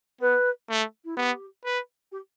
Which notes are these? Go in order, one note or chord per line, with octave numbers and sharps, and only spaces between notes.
B3 B4
A3
E4
B3 G4
B4
G4